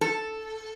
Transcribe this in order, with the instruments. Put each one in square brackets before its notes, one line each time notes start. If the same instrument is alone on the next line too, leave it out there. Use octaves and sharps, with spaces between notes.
[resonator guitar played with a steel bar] A4